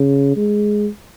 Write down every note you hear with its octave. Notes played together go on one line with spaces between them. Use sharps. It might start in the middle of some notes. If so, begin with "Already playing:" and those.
Already playing: C#3
G#3